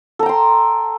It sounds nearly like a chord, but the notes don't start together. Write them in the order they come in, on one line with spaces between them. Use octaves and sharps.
A4 A#5 G5 C6